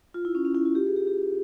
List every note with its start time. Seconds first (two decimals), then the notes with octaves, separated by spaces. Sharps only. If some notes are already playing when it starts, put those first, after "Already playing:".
0.14 F4
0.25 E4
0.35 C#4
0.45 C#4
0.55 E4
0.65 F4
0.75 G4
0.87 G#4
0.96 G4
1.07 G4